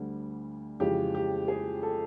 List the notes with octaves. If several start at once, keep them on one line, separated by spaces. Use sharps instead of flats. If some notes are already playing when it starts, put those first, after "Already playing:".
Already playing: D2 D3 G3
F2 C#3 E3 G#3 G4
G4
G#4
A4